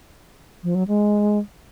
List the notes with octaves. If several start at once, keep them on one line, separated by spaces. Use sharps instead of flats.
F3
F#3
G#3